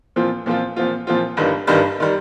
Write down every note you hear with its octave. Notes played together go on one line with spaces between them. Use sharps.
A#2 F3 C4 F4
A#2 F3 C4 F4
A#2 F3 C4 F4
A#2 F3 C4 F4
G1 G2 D#3 G3
G1 G2 D#3 G3
D#3 G3